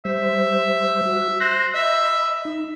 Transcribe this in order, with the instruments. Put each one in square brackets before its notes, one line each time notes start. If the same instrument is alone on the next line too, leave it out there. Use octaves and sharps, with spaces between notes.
[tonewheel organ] G3 C5 [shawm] E5
[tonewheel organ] F#4
[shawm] C5 [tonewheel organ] F#6 A#6
[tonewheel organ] D#5 B5 [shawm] E5
[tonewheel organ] D#4